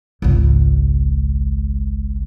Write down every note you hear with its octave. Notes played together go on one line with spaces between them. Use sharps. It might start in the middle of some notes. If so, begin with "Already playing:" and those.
G#1 C#2